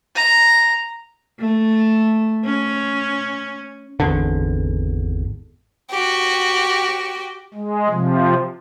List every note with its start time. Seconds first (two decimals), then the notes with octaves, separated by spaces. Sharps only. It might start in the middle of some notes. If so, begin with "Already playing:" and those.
0.16 A#5
1.40 A3
2.45 C#4
4.00 G#1 E2 D3
5.91 F#4 G4
7.54 G#3
7.89 C3 F3